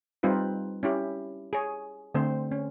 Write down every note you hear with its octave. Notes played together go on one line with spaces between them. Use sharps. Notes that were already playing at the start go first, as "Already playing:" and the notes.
G3 C4 D#4 F4 B4
C#4 E4 G4
G#4 C#5
D3 A3 C4 C5
C#4